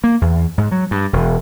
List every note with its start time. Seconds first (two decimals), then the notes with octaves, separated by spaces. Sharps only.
0.04 A#3
0.21 E2
0.58 G#2
0.71 F#3
0.91 G2
1.13 E1